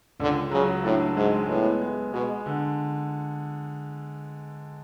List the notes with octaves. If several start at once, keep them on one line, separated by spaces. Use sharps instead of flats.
C#2 D3
C#3 F#3
A2 D4
G#2 G#3
A2 B3
G#3
B2 G#3
D3